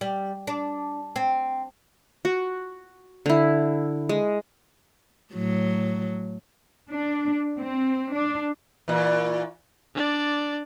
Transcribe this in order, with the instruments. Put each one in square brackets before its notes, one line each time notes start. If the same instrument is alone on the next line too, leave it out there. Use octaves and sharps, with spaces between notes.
[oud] G3
D4
C4
[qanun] F#4
D3 E4
G#3
[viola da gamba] A2 F#3
[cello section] D4
C4
D4
[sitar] A#2 E3
[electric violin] D4 D5